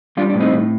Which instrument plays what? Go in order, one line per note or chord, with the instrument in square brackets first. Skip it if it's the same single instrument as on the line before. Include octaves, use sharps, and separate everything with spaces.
[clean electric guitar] G3 D4 F4
D4
A2
C4 D#4
A2